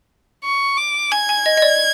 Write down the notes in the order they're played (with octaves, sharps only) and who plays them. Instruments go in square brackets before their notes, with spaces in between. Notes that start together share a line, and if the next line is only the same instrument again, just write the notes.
[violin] C#6
D6
[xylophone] G#5 [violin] G#6
[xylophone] G#5
D#5
D#5
D5